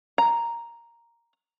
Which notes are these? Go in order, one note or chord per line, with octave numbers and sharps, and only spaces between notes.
A#5